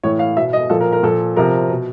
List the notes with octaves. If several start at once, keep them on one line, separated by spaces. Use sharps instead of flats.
A2 E3 C#5
F5
B2 E5
D#5
A#2 F3 A4
A#4
A#4
A#2 F3 A4
C3 F3 A#4
B2